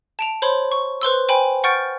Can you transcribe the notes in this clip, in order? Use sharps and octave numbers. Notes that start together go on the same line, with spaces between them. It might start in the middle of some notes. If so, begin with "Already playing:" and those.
A5 D7 F7
C5 C#5 B5 C6
C#6
B4 C5 C6 E6
C5 G5 G#5 B5
F#5 C#6 F6 G6 A6 D7